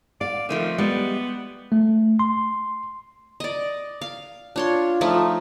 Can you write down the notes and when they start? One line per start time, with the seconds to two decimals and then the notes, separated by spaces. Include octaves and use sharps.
0.21 D5 F5
0.49 D#3 F3 A3 C4
0.78 G3 G#3 B3
1.72 A3
2.19 C6
3.40 D5 D#5
4.01 F5
4.56 D4 F4 C#5 C6
5.01 F3 A3 D#4